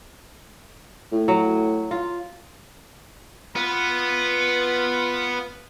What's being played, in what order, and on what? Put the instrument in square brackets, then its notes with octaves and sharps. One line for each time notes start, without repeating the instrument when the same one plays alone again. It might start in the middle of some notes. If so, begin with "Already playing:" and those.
[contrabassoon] A2
[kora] F#3
F4
[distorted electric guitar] B3 [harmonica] F4 B4